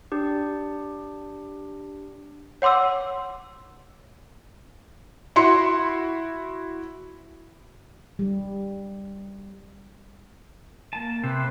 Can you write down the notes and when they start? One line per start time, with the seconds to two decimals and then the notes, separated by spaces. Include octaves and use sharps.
0.12 D4 G4
2.62 C#5 F#5 C6 D6 E6
5.36 E4 F#4 C6 C#7
8.19 G3
10.93 A#3 A5
11.24 C3 B4 C5